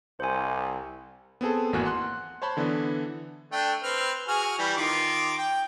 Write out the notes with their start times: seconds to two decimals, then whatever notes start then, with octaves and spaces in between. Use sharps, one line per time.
0.20 C2 C5 G#5
1.41 B3 C4 G#4 A4
1.73 G#1 E2 A#3 F#4 G#5 F#6
1.85 F#5 C6 F#6
2.42 C5 C#5 A5 B5 C6
2.57 D3 E3 B3 D4
3.52 A3 D4 G5
3.83 C4 B4 F6
4.28 F#4 G#4 F6
4.59 E3 G3
4.77 D#3 F4 D6
5.38 G5